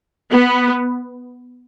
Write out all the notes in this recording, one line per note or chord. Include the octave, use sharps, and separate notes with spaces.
B3